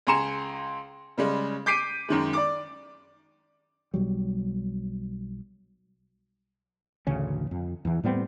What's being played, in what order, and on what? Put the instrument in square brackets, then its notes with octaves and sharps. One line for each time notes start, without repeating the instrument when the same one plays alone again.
[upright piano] C#2 G#5 A#5 C6 C#7 E7
C#3 G3 G#3
D6 G6 B6 C7 D7 D#7
F#2 D#3 G#3
D5 D6
[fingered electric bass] B1 F#3 G3
[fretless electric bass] A1 D2 C#3 C#4
F2
E2 E3
A2 G3 B3 C4